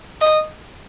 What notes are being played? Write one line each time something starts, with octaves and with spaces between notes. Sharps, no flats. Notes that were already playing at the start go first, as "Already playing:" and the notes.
D#5